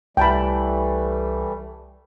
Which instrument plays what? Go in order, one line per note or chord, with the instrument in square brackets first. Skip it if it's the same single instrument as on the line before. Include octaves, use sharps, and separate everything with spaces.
[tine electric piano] C2 [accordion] E3 G3 A3 [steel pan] G5 A5 B5